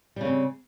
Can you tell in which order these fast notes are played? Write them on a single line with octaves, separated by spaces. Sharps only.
G3 C#3 C4